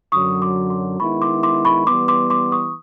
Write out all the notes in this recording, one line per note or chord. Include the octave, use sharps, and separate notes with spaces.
F#2 D3 F#3 C#6 D#6
C6 D6
C6 D6
D#3 G#3 B3 E4 B5 C#6
C6 D6
C6 D6
B5 C#6
E3 G3 B3 C6 D6
C6 D6
C6 D6
C#6 D#6